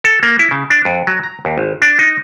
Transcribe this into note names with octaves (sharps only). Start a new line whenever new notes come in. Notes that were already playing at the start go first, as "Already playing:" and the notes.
A4
A#3
E4
C#3
D4
F2
F#3
A#5
D#2
G#1
D4
D#4